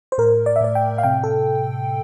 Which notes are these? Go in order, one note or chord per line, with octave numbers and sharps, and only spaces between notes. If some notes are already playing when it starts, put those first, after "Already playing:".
C5
A2 A#4
D5
E5
A2 D5
G5
F5
C3 G5
A4